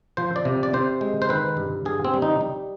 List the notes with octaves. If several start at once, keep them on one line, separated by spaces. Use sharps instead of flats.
F3 C5
D5
C3
D5
C3 C5
G#3
C5
D#3 B4
G2
G2 G#4
C4
G3
D#4
G3